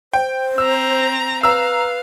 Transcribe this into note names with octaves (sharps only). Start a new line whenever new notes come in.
C5 G5
C4 A#5 E6
B4 F5 A#5 E6